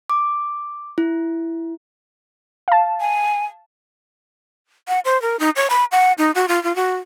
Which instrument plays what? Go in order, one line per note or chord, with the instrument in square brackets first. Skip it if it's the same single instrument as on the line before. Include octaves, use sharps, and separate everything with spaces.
[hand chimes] D6
E4
[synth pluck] F5 A5
[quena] G#5
[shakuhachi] F#5
C5
A#4
D#4
C#5
B5
F#5
D#4
F#4
F4
F4
F#4